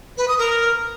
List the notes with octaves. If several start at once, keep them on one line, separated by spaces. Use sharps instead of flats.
B4
D#6
A#4